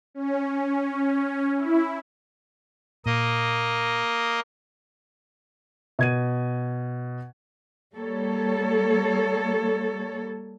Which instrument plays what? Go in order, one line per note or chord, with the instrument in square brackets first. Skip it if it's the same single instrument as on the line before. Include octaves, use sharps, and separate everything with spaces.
[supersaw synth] C#4
E4
[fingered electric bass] A#2 [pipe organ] A#3 D#5
[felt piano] B2 G#6 D#7
[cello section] G3 A#3 A4 C#5